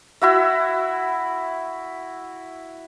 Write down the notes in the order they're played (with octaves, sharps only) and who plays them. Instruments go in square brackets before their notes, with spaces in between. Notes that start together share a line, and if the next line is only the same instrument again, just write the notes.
[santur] E4 F#4 E5